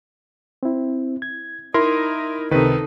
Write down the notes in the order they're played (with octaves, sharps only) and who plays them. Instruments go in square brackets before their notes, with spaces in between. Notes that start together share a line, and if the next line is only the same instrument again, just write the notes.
[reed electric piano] C4 E4
G#6
[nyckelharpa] D#4 [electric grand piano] E4 A#4 [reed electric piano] C6
[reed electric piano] C#2 C3 [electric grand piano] D#3 B4 [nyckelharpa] D#4 A4